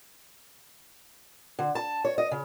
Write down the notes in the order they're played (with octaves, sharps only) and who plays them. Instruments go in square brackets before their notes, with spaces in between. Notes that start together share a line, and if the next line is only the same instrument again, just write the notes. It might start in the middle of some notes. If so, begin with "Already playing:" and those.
[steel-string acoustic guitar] D3
A5
C#5
D#5
C#3